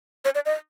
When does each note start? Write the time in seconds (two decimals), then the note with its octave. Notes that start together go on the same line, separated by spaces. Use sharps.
0.25 C#5
0.35 D5
0.46 D#5